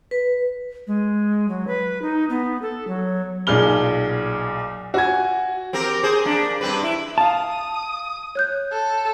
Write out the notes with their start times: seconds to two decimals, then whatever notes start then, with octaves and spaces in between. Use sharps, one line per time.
0.11 B4
0.87 G#3
1.49 F#3
1.67 B4
2.02 D#4
2.30 B3
2.62 A4
2.87 F#3
3.47 B1 A#2 G#4 F6 G7
4.94 F#4 G#5 G#6
5.73 C4 G4 A#4
6.03 G#4 C5
6.25 A#3 D4
6.61 G2 C4 B4
6.83 E4
7.18 F5 A5 D#6
8.35 C#5 F#6 G6
8.72 A4